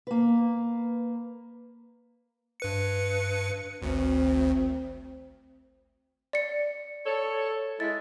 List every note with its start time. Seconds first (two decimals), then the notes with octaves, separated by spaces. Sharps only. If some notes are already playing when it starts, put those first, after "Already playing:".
0.07 A#3 B4
2.60 G2 B4 C#7
3.82 G#1 D2 C4
6.33 D5 C#7
7.06 A4 C#5
7.80 G#3 E4 A6